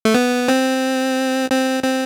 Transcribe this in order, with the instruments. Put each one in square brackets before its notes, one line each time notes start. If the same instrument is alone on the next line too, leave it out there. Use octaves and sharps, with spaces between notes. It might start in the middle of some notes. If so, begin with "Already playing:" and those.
[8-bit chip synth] A3
B3
C4
C4
C4